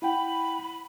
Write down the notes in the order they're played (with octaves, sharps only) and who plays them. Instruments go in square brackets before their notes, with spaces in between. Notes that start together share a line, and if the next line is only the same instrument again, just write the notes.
[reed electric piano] E4 F#5 G5 [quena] B5